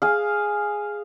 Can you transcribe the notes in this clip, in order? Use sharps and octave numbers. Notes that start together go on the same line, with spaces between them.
G#4 F5